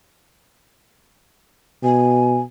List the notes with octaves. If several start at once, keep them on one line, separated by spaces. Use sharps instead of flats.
B2 G#5